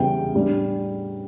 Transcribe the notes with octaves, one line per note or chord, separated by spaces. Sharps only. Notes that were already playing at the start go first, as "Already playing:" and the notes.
Already playing: E2 C#3 E3 G3 C#4 G5
A2 G3 D4